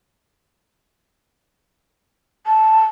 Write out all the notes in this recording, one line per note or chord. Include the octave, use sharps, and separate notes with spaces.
A5